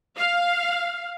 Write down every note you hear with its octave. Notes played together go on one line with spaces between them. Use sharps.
F5